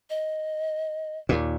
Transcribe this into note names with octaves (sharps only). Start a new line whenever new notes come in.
D#5
D#2 A#2